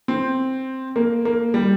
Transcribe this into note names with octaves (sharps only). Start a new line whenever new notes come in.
C4
A#3
A#3
G3